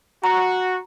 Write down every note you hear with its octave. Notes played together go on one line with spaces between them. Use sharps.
F#4 A#5